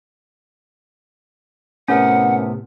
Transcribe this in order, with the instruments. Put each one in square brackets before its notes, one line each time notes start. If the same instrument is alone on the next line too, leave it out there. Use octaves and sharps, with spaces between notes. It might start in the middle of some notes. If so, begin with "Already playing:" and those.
[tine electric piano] A2 C3 B3 [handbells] C#4 A#4 [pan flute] F#5